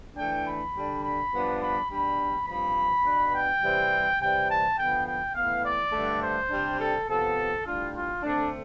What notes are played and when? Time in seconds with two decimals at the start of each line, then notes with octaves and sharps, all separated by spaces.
0.16 E3 A3 D4 G5
0.45 B5
0.74 D3 G3 D4
1.03 B5
1.31 G2 F3 B3 D4
1.60 B5
1.89 B2 G3 D4 B5
2.47 G2 F3 C4 B5
3.04 B2 B3 D4
3.32 G5
3.62 C3 E3 G3 C4
4.20 C3 E3 G3 G5
4.48 A5
4.77 D3 F3 B3 G5
5.06 G5
5.34 A2 E3 B3 F5
5.63 D5
5.92 G2 D3 A3 D4
6.21 C5
6.50 C3 G3 D4
6.78 A4
7.07 C3 F3 B3 A4
7.65 A2 G3 D4 F4
7.93 F4
8.22 D3 A3 C4 D4